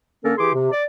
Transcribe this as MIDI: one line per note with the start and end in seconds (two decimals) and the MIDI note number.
0.24 0.33 50
0.24 0.33 58
0.24 0.33 61
0.24 0.33 69
0.24 0.33 70
0.38 0.53 52
0.38 0.53 67
0.38 0.53 68
0.38 0.53 84
0.38 0.53 86
0.54 0.71 48
0.72 0.83 74